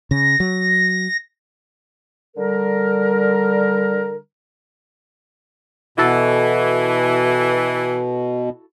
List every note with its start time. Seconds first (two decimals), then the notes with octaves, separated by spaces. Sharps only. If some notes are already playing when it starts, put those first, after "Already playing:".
0.11 C#3 A#6
0.40 F#3
2.37 D3 G3 A#4
5.98 B2 E3 E4 F#4 A4